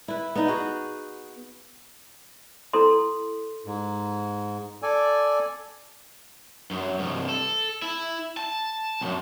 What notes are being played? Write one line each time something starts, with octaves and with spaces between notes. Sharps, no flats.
E4 B4
B3 D#4
F#4 G#4
E4 A4 C6
G#2
A4 D5 G#5
F#2
C2 G2
A4
E4
A5
B1 F#2